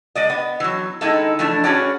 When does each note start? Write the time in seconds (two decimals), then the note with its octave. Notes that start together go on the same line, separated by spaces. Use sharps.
0.15 G#3 D5 D#5
0.30 B3
0.60 E3 F#3
1.01 D#3 G#3 D#4 E4 A4
1.39 E3 F3 A3 D4
1.64 C#4 F#4 G#4 B4 C#5 D5